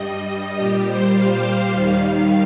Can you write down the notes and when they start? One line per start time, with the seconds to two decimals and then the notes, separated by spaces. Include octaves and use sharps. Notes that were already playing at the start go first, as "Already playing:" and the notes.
Already playing: G2 G3 D#5
0.57 A#2 G3 G4
0.86 C5
1.15 F5
1.74 D#2 D#3 G3